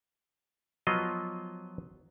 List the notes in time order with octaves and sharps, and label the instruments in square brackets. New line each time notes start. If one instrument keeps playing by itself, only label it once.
[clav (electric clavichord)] F3 F#3 B3 F4 D#5